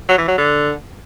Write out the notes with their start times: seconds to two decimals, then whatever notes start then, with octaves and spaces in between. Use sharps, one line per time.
0.09 F#3
0.18 E3
0.28 F#3
0.38 D3